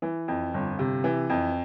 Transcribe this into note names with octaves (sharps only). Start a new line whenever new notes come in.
E3
F2
G1
C3
E3
F2